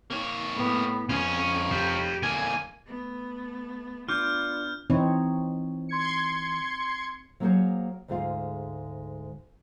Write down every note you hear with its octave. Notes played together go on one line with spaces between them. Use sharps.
A#3 C#5
A2 B3
F2 C#4 F4 C#5
G4 F5
D3 A#3 G#5
A3 B3
B3 D4 F4 D6 F6 G6
E3 C4 D#4 C#5
C6 G#6 C#7
F#3 A#3 B3 G#4 C5 C#5
D2 G#2 G#3 F4 F5